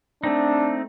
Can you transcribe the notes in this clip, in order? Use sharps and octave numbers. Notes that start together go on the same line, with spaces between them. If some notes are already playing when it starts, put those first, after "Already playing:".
A3 C4 D4 D#4